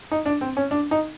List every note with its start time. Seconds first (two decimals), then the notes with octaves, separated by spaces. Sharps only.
0.11 D#4
0.26 D4
0.41 C4
0.57 C#4
0.71 D4
0.91 D#4